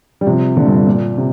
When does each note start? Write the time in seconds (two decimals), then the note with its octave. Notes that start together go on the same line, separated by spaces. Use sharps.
0.21 G3
0.26 C3 F3
0.57 A#2 D3
0.67 G2
0.77 G2
0.87 A#2
1.17 C3